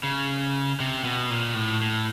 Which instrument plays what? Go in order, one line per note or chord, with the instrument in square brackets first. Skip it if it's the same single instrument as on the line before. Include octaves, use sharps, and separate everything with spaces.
[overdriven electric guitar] C#3
C3
B2
A#2
A2
A2